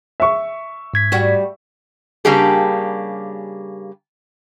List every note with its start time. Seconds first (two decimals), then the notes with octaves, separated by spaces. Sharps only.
0.20 E5 C#6
0.94 G#2 G#6 B6
1.12 G3 F#4
2.25 C#3 G3 A#3 D4 G4 G#4